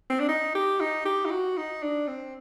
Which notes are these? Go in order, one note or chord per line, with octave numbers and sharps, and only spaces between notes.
C4
D4
D#4
G4
D#4
G4
D#4
F#4
D#4
D4
C4